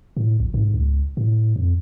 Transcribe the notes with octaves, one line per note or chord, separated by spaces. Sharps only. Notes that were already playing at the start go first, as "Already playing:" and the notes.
A2
A#1
G#2
C#2
A2
F2